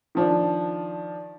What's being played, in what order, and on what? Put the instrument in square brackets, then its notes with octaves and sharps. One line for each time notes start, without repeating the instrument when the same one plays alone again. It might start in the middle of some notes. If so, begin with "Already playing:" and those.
[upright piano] D#3 F3 D4